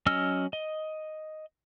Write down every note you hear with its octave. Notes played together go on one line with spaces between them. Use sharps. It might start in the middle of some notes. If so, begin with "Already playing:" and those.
F#3 C#4 D#5 E6 F6
D#5